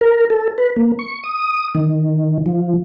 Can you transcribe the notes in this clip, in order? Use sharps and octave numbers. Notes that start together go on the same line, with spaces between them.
A#4
A4
B4
A#3
C#6
D#6
D#3
F3